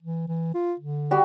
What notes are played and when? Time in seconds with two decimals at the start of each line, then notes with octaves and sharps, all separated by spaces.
0.02 E3
0.28 E3
0.54 F4
0.79 D3
1.11 G3 F#4 G4